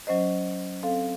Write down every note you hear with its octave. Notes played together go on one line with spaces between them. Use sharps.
F#3 C#4 C5 D#5
C4 A4 F5